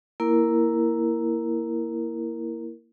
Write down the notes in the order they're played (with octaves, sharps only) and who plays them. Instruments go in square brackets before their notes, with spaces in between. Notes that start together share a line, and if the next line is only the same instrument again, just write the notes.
[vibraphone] A#3 E4 A#4